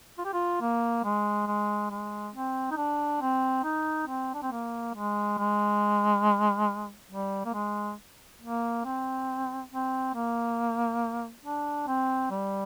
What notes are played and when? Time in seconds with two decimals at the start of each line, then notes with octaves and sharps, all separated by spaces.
0.18 F4
0.25 G4
0.33 F4
0.61 A#3
1.04 G#3
1.47 G#3
1.91 G#3
2.35 C4
2.71 D#4
2.77 D4
3.21 C4
3.64 D#4
4.07 C4
4.34 D4
4.43 C4
4.52 A#3
4.94 G#3
5.38 G#3
7.11 G3
7.46 A#3
7.54 G#3
8.41 A#3
8.85 C4
9.71 C4
10.14 A#3
11.45 D4
11.87 C4
12.31 G3